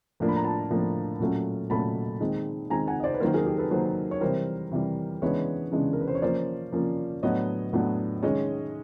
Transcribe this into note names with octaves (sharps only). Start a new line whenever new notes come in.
A2 F3 A#3 D4
B5
A#5
A5 B5
A2 F3 A#3 D4
A#2 F#3 A3 C#4
A#2 F#3 A3 C#4 A5 B5
D#3 G#3 C4
D#3 G#3 C4 G#5 A#5
F#5 G#5
D#5
C5 D5
B4
D#3 F#3 A#3 A#4 C5
G#4 A#4
G4 A4
A4 B4
D#3 F#3 A#3 A#4 C5
C#5
C3 E3 G3 A#4 C5
C3 E3 G3
C#3 E3 G#3 B3 D4 B4 C#5
C#3 E3 G#3 B3 D4
A#4
B4
C5
C#5
F3 A#3 C#4 C5 D5
F3 A#3 C#4
A2 F#3 B3 D4 C#5 D#5
A2 F#3 B3 D4
D#3 G#3 C#4 C#5 D#5